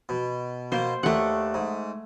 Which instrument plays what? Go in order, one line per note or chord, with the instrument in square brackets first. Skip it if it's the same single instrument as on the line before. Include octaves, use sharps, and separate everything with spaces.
[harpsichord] B2
[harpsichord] B2 A#3 [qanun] C5
[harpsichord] D#2 D4 [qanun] A3 F#5
[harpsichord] G#2